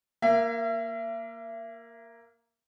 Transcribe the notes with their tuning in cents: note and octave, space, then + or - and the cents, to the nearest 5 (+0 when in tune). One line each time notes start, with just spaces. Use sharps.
A#3 +0 E5 +35